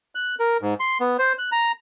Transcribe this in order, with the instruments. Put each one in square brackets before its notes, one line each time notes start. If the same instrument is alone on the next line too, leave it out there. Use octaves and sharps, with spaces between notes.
[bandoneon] F#6
A#4
G#2
C6
B3
C5
F#6
A#5